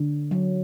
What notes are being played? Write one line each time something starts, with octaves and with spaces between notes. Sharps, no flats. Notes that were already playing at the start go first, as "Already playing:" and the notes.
Already playing: D3
F#3